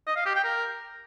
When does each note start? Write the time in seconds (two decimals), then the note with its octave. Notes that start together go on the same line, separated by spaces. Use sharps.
0.07 D#5
0.16 F5
0.26 G4
0.35 G5
0.44 A#4